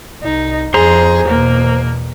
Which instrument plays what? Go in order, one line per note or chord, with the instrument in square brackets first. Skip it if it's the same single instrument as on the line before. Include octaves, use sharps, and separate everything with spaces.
[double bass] C2 [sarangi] D#4
[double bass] F2 [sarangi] G#4 [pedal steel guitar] C5 A#5 C6
[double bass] E2 B2 [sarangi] A#3